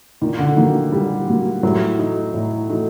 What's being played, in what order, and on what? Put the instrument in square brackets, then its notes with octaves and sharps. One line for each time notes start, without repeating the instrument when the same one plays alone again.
[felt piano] A#2 [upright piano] D#3
[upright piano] D3
[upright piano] D#3 [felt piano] F#3 A#3
[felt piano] A#2 [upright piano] G3
[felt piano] F#3 A#3
[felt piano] A2 [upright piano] F#3
[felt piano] A3 D#4 F#4
A2
A3 D#4 F#4